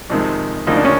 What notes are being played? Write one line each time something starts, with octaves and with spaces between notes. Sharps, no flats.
F2 C3 D#3 G#3
D2 C#3 F3 A#3 D#4
D4
C#4